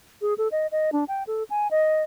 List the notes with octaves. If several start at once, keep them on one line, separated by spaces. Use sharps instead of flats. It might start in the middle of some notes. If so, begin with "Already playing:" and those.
G#4
A4
D#5
D#5
D4
G5
A4
G#5
D#5